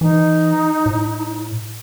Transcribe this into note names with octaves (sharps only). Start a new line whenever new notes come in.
E3 D#4
A2